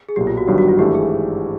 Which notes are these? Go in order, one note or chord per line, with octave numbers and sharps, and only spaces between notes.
G#4
B1 A#2 F#3 G4
F4
F#4
G1 G2 D#3 F#3 G4
F#4
F4
G#1 G#2 E3 A3 D4 G4
G#4